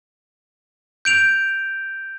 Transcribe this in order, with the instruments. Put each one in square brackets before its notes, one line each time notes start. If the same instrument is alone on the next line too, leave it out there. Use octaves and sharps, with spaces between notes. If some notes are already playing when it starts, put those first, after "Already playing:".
[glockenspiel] G6 D7 F7